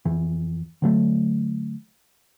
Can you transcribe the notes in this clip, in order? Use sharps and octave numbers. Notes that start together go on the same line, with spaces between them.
F2 E3
D3 F#3 A3